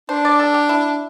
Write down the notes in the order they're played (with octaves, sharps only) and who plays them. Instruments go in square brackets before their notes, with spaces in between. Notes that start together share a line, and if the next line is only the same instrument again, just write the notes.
[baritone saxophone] D4 [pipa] C5
[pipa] D5
A4
G4
E4